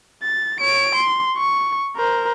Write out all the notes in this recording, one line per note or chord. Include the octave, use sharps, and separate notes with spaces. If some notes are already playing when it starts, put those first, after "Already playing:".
A6
C#5 D7
C6
C#6
A#4 C5